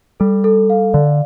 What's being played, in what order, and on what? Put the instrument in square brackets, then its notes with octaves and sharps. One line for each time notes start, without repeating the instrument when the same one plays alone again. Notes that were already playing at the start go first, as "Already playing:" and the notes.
[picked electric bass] G3 [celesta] A4
[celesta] A4
F5
[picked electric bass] D3 [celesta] D5